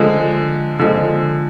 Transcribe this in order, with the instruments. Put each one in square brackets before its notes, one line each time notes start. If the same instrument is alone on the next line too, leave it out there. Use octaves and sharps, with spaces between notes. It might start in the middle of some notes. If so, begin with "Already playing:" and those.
Already playing: [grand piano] D3 F3 G#3
D3 F3 G#3